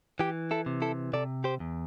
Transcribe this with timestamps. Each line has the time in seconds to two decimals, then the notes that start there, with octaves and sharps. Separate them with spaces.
0.19 E3 G4
0.51 E4 A4
0.66 C3
0.82 E4 A4
1.13 C3 A4 D5
1.44 G4 C5
1.60 E2